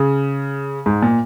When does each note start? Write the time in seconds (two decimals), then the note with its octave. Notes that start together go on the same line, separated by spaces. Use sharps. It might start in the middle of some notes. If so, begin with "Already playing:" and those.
Already playing: C#3
0.86 G#2
1.02 A#2